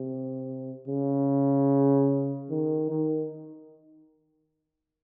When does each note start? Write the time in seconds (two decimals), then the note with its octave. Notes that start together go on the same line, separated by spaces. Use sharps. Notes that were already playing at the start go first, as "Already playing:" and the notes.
Already playing: C3
0.88 C#3
2.50 D#3
2.90 D#3